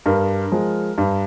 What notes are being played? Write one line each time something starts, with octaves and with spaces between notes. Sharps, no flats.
G2 A#4
F3 G#3
G2